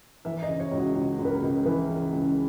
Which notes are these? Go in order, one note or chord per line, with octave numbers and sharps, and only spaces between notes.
E3 E5
D#5
C#3
C#5
C#2
F#4
C#2
C#2
B4
A#4
C#2
E3 B4
C#3
C#2